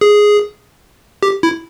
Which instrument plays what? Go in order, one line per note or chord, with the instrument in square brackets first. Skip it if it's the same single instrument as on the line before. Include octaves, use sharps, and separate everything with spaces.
[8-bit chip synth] G#4
G4
E4